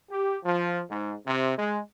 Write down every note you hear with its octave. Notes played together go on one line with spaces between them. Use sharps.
G4
F3
G#2
C3
G#3